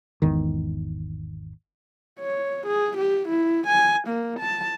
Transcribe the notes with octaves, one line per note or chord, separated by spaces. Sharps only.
G#1 E2 D#3
C#5
G#4
G4
E4
G#5
A#3
A5